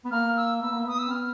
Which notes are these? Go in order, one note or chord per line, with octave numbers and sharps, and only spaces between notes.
B3
A#3 F6
E6
B3 E6
A#3
B3 D#6
E6
C4
B3 F6